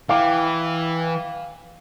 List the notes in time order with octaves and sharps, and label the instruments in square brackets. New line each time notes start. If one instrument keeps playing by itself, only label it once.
[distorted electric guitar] E3 [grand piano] F5 G5 D6